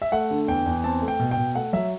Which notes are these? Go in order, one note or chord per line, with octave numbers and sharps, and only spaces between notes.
E5
A3 F#5
D3
E2 G5
E2
C4 A5
A3
G5
B2
G5
B2
A3 F#5
F#3 E5